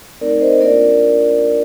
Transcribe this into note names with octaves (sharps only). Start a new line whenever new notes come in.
A3 C4 D#4 A#4 D5
C5 D#5
A#3 D4 F4 A#4 D5